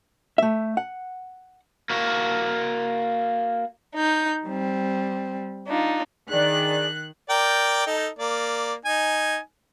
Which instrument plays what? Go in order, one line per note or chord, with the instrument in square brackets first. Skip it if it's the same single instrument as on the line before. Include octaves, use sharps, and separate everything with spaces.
[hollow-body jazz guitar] A3 E5
F#5
[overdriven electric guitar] A#3 F#4
[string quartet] D#4 G6
G3 C4
D4 D#4 F4
[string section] D#3 F#6 [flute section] D4 G#4 D5
[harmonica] A#4 D5 G5
D#4 A4
A#3 D5
D#4 G#5